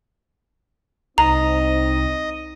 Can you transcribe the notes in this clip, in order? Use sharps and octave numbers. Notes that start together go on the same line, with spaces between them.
C2 C4 D#4 D#5 A#5